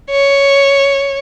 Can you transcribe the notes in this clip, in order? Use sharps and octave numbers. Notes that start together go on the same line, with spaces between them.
C#5